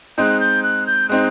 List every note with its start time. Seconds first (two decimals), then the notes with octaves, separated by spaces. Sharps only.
0.18 G#3 C4 D#4 F#6 G6
0.40 G6
0.63 F#6
0.87 G6
1.09 G#3 C4 D#4 F#6